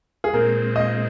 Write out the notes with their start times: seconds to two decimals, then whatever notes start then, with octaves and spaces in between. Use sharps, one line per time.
0.24 G#4
0.33 A#2 G#3 C4 A#4
0.76 D#5